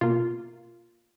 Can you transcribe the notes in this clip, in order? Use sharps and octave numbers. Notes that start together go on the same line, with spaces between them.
B2 A#3 F4